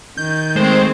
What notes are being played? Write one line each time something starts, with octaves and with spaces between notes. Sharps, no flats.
D#3 G6
G#3 A3 C4 C5